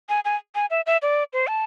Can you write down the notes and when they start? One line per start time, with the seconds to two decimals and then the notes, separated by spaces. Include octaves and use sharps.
0.09 G#5
0.25 G#5
0.55 G#5
0.70 E5
0.86 E5
1.02 D5
1.33 C5
1.47 A5